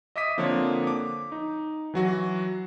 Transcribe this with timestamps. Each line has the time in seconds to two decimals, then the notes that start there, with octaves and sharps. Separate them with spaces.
0.16 D#5 E5 D6 D#6 B6 D#7
0.37 D3 F3 A#3 C4 D4 C#5
0.87 D6
1.32 D#4
1.94 E3 F#3 F#4